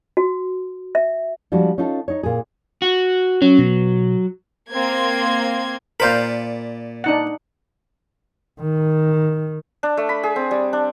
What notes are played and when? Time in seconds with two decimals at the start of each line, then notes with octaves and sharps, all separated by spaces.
0.17 F#4
0.95 E5
1.52 F3 G3 G#3 D4 F#4
1.78 C#4 D#4 F4 A4
2.08 D#4 C#5
2.23 A#2 G#4
2.82 F#4
3.42 F#3 C#4
3.59 B2
4.71 A#3 C4 C6 G#6
6.00 A#2 A#4 C5 D5 F5 B5
7.04 D4 D#4 F#5
8.61 D#3
9.83 D4
9.97 A3
10.09 B5
10.23 G#4
10.36 C4
10.51 G3
10.73 D4